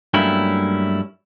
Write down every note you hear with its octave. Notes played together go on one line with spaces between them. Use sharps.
G2 F#3 A3 A#3 C#4 E4